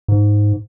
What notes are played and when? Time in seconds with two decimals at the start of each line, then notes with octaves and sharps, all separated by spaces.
0.08 G#2